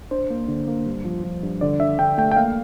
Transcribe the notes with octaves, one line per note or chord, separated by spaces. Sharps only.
D4 C5
A#3
D3
A#3
G2
F3
F3
G2
D3 D5
D3 E5
D3 G5
A3 G5
G5
A#3 F5